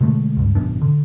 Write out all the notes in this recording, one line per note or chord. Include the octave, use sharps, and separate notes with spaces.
B2 D3 G#3 A3
C#2 G2
G#1 F#2 B2 D4
D3